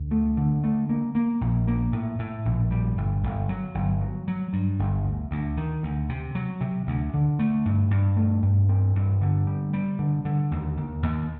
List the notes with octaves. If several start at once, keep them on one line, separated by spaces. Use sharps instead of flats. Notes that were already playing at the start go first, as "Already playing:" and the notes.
Already playing: D2
A3
D3
A3
A#3
A#3
A#1
A#3
A2
A2
A#1
G3
G1
G1
F#3
G1
F#3
F#3
G2
G1
D2
D2
D#3
D2
C3
F#3
C3
D2
D3
A3
G2
G2
A3
G2
C4
G2
D3
G3
G3
D3
D3
D#2
D#2
D#2